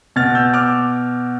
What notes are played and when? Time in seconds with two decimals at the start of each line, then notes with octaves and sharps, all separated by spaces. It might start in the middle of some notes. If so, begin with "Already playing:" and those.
0.16 B2 F6 A6
0.35 E6 G6
0.54 D6 F6